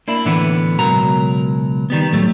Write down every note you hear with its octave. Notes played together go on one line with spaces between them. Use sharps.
A#3 D4 E4
A2 D3 E3 B3
C#2 B2 F#3 A#4 A#5
D#3 G3 B3
A2 F#3 G3 A3